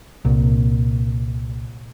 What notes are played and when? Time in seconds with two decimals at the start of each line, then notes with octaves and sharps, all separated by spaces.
0.25 C2 A#2